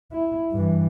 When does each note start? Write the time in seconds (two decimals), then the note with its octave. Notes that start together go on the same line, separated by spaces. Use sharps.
0.12 E4
0.52 G2 E3